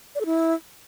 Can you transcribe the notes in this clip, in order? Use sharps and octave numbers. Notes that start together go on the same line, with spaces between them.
D5
A4
E4